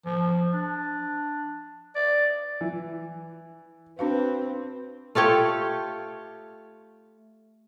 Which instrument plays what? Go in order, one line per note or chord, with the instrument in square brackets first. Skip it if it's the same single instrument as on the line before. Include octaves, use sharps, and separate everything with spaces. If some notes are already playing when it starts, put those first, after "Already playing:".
[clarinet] F3
D4
D5
[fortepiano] E3
[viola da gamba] C4 [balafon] D4 F#4 F5 [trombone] B4
[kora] A3 F4 G4 C#5